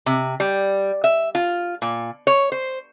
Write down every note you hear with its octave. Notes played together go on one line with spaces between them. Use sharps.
C3
G3
E5
F4
A#2
C#5
C5